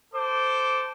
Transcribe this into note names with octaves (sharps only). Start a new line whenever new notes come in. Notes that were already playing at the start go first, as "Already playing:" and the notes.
A4 C5 D6